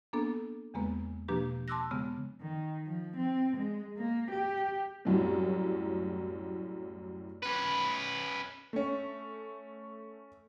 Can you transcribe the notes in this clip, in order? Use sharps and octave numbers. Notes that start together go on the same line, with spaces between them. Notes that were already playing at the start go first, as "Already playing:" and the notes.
A#3 B3 D4 A4
E2 C#3 G#3 A#3 B3 B4
B2 F3 A#3 D4 G4 B4
A5 C6 D6 E6 F#6 A#6
C#3 G#3 B3
D#3
F3
C4
G#3
A#3
G4
C2 F#2 A2
C#4 B4
A3 C#4